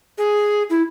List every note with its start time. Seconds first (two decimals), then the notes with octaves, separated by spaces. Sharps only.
0.18 G#4
0.70 E4